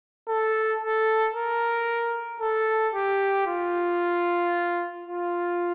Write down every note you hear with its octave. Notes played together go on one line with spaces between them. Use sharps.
A4
A4
A#4
A4
G4
F4
F4